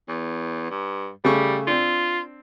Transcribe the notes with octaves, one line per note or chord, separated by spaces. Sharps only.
E2
G2
C#3 G3 A3 C#6
C4 D4 F4